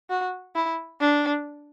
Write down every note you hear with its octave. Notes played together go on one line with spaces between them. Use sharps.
F#4
E4
D4